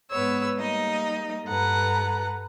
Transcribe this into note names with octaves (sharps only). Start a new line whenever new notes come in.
G#2 B3 B4 C#5 E6
G3 A#3 D#4 D#5
G2 A4 B4 F#5 A#5